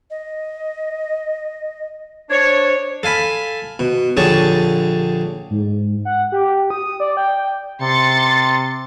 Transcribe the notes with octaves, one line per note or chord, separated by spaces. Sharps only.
D#5
D4 C5 C#5
A4 F5 G#5 B5
B2
A#1 D3 G4 G#4 C#5 A5
G#2
F#5
G4
D#6
D5
G5
C3 C6 A6 C#7